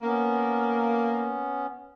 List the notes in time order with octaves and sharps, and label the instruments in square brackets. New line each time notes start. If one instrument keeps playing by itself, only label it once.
[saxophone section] A#3 [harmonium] B3 C#4